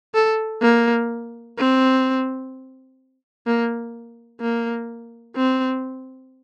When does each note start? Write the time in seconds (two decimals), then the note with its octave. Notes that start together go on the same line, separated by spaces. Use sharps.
0.14 A4
0.62 A#3
1.57 C4
3.46 A#3
4.41 A#3
5.36 C4